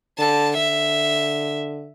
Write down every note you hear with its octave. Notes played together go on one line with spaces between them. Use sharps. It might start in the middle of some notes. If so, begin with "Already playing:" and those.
D3 A5
D3 E5